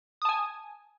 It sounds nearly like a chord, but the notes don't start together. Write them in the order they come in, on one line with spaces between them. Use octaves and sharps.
D#6 A5 G#5